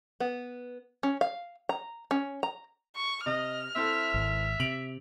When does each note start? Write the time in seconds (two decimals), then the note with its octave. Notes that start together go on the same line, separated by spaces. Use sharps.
0.20 B3
1.03 C#4
1.21 F5
1.69 A#5
2.11 C#4
2.43 A#5
2.95 C#6
3.26 C3 D#5 F6
3.76 C4 E4 A4 E5
4.14 G#1
4.60 C3 D7 F7 F#7